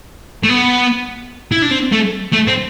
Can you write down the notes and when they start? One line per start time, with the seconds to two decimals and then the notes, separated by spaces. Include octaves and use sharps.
0.44 A3
0.49 B3
1.52 E4
1.62 D4
1.71 C4
1.92 A3
2.33 A3
2.48 C4